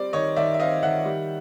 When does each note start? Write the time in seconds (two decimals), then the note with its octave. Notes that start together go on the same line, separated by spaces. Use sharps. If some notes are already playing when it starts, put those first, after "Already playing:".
Already playing: G3 C4 D5
0.13 D#3 C#5 D#5
0.36 D#3 D5 E5
0.54 E5
0.59 C4 D#5 F5
0.83 D#3 E5 F#5
1.05 G3